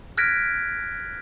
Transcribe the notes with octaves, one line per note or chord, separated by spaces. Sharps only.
F6 F#6 G#6 A#6 B6 D7